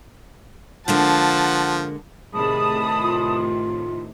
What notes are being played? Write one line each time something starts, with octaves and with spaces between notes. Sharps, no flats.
D3 F3 G#3 A#3 F#5 A5
A2 C3 D#3 G#4 A5 B5 D#6
F4